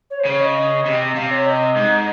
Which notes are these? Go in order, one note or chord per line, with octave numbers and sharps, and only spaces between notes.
C#5
C5
C#3 C#5
D#5
C3
C3 F5
C#5
D#5
G#2